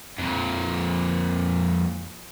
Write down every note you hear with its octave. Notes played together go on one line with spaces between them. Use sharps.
F2 A#2